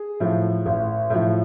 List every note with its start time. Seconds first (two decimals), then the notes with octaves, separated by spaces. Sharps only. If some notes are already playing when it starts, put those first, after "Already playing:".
Already playing: G#4
0.20 A2 F3
0.66 A1
1.10 A2 F3